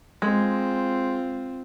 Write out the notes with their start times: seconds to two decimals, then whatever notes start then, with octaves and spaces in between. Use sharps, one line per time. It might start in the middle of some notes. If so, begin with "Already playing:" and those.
0.22 G#3 C4 F4